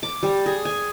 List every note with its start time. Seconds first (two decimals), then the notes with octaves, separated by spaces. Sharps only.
0.03 D6
0.23 G3
0.46 G#4
0.65 G#5